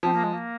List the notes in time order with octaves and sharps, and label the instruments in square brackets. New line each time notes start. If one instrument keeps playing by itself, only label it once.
[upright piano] F3 [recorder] C4
[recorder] A#3
G#3
A#3